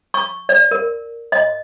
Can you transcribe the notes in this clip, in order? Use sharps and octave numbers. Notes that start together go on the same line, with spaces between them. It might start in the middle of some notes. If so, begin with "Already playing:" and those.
C#6
D5
A#4
D#5